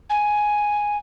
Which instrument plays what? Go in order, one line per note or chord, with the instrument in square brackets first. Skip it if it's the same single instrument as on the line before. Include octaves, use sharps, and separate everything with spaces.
[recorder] G#5